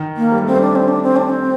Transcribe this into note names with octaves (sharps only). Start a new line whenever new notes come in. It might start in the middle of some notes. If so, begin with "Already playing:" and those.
Already playing: D#3
A#3
G3
A3 C4
G3
D4
C4
D4
C4
D4
C4